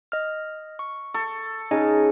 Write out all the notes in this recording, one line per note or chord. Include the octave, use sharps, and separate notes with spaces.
D#5 F6
C#6
A4 C#6
C#3 D#4 D#5 G#5